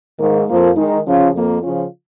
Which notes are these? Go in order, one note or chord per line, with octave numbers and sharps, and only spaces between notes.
G#2 D#3 A#3
F2 F3 A#3
D#3 G#3 D#4
C#3 F3 C#4 F4
F2 F3 A#3
C#3 F3 C#4 F4